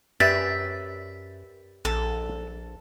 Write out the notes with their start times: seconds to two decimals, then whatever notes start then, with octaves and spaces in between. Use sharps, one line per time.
0.20 F#2 G4 B4 D5 E5 A6
1.85 A#1 A4